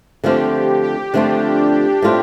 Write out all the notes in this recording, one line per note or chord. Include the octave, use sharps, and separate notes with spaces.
D3 F3 A3 C4 F4 G4
G4
D3 F3 A3 C4 D4 F4
A2 A3 C4 F4